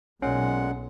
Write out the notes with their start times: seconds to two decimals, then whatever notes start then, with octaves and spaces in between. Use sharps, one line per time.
0.22 B1 A#2 G#3 C#4 F#5